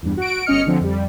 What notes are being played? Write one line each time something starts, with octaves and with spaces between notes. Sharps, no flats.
E2 G2
F#4 D7
G1 C#4 D#5 F6 C#7
D3 F3 C4
F2 G3